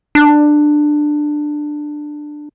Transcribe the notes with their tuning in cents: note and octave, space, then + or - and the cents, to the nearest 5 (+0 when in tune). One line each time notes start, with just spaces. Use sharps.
D4 +15